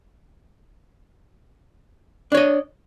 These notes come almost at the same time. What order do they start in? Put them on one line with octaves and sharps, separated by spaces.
D4 C#5 D#5